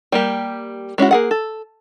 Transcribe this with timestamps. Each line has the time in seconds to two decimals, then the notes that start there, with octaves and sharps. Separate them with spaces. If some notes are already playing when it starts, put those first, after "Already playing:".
0.12 G3 A#3 G4
0.98 G#3 C#4 E4 F#4
1.11 A#3 G#4 F#5
1.31 A4